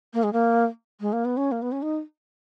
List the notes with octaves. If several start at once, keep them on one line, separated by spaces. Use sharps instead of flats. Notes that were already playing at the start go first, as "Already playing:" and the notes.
A#3
G#3
A#3
G#3
A#3
B3
C#4
A#3
B3
C#4
D#4